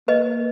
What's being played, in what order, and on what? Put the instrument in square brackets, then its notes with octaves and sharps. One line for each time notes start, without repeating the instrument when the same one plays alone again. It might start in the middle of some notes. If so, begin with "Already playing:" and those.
[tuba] A#3 [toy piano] B4 D#5